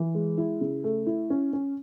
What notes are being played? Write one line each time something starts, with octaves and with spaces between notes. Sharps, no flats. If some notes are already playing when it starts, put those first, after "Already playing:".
Already playing: E3
G#3
E4
C#3
A3
E4
C#4
C#4